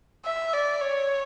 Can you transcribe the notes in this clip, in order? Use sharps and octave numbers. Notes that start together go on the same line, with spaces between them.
E5
D5
C#5